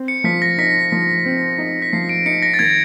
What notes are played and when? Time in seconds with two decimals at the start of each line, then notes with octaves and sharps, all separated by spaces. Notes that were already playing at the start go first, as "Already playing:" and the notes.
Already playing: C4
0.08 C#7
0.24 F3 B6
0.42 A#6
0.58 D#4 B6
0.92 F3
1.25 C4
1.58 D#4
1.82 B6
1.93 F3 C7
2.09 D7
2.26 D#4 C#7
2.42 A#6
2.54 A6
2.59 D#3 G#6